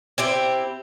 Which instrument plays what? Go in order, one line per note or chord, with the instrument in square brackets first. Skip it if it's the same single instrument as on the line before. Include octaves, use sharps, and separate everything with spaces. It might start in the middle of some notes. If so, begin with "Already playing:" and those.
[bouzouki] C4 E4 G4